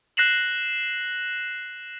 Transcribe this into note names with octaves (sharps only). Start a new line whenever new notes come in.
F#6 A#6 C7 E7 F#7